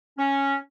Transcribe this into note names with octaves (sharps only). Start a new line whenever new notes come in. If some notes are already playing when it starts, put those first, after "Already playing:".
C#4